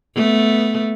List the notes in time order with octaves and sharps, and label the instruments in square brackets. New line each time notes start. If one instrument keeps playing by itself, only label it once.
[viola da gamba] A3 B3